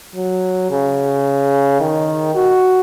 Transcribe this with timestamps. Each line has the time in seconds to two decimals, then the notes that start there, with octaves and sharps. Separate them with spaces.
0.15 F#3
0.71 C#3
1.81 D#3
2.35 F#4